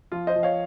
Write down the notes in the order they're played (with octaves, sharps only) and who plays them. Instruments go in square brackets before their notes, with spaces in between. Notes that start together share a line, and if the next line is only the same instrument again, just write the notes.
[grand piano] F3 F4
C5 D#5
F3
C#5 F5